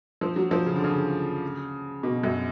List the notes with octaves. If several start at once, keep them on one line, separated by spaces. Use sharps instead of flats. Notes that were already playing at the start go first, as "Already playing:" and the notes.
F3
F#3
F3
C#3
D3
C#3
B2
F#2